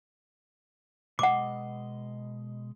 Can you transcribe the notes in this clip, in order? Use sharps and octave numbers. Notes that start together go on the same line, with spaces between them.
B2 G#3 D#5 F#5 D6